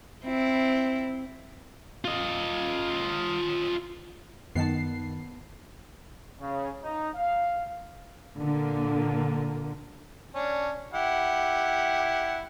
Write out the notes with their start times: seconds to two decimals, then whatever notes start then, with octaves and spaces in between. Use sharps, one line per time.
0.24 C4 E4
2.05 F4 D#5
4.55 F#2 D#3 B3 A5 C7
6.40 C#3
6.84 D#4
7.15 F5
8.39 A#2 D3 A#3
10.35 C#4 D4
10.94 E4 G4 F#5